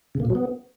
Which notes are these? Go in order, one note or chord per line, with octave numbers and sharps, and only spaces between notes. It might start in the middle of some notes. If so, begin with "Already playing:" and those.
C#3
A#3
A#2
F#3
B3